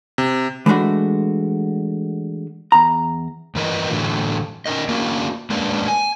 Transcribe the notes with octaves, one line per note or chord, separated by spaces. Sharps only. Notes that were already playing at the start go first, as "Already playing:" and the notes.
C3
E3 G#3 A3 D4 F#4
E2 A#5
G2 E3 A#4 B4 D#5
A2 D3 E3 F#3 F#4
C#4 D#4 A#4 D#5
A#3 C#4 D4 E4 F#4 A#4
G#3 A#3 C#4 D4 B4
G#5